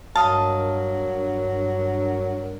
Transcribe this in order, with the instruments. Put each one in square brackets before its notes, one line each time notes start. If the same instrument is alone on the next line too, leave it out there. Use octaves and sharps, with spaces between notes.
[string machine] G2 D4 A#4 [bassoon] F#3 [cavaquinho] D#5 F5 [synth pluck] A5